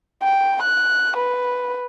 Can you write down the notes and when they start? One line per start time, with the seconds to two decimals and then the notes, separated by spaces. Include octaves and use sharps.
0.23 G5
0.63 F#6
1.17 B4